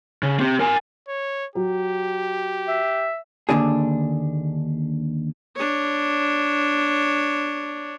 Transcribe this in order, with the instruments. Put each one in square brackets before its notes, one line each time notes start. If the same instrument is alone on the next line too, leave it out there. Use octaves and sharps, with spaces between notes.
[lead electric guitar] C#3
C4 G4
A#4 G#5
[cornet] C#5
[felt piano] F#3 [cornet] G4
[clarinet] E5
[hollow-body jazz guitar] D#2 G#2 D3 D4 G#4
[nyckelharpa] D4 C#5